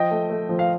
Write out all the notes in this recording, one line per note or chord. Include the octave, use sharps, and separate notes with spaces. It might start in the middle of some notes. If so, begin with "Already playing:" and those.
Already playing: F3 D#5 G5
A3
A3
F3
F5